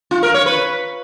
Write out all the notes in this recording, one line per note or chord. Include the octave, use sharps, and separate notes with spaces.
F4
A#4
C#5
B4